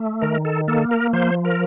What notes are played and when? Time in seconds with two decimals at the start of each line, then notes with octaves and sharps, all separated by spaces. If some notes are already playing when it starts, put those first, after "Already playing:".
Already playing: A3
0.22 D#3 A#4
0.45 A4
0.68 A#3 A4
0.91 A#4
1.13 F3 C5
1.45 A#4